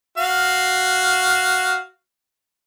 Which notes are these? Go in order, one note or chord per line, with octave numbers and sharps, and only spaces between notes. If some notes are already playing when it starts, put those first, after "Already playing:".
F#4 F5